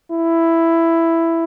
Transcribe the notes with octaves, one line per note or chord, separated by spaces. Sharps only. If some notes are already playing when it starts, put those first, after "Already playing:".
E4